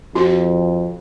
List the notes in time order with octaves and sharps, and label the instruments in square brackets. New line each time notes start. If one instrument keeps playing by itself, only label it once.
[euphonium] F2 [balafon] F#4